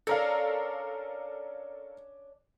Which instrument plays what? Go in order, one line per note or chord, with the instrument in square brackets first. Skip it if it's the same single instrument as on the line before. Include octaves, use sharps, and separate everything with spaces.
[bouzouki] C#4 D4 [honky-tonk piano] A4 A#4 F5